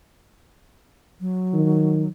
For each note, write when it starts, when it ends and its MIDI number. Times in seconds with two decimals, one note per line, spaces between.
1.21 2.08 54
1.53 2.06 51